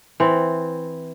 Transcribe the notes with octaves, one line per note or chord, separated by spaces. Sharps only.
E3 C4